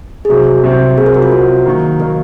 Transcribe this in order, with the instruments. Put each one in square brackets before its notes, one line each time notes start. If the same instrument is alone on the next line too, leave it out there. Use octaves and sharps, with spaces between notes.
[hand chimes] G#4
[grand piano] C2 C3 F#3 C4 [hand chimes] F#4
[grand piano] C2 C3 F#3 C4
[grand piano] C2 C3 F#3 C4 [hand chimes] G#4
[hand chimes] A#4
F#4
F4
[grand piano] C2 C3 F#3 C4 [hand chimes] F#4
[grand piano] D#3 F#3 A#3
[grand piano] D#3 F#3 A#3 [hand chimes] A#4